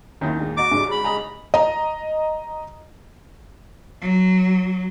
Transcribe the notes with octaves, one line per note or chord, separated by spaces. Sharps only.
D#2 D#3 C#4 E4
A#2 G#3
F#4 D#5 A#5 D6 A6
G#2 C#3 G3
B5
D#5 G#5 A#5
D#5 A#5
F#3